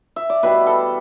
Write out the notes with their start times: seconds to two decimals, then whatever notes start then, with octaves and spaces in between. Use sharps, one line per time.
0.16 E5
0.30 D5
0.43 B2 G3 E4 B4
0.67 A4